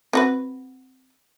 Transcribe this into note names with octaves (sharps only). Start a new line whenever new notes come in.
C4 F#4 B4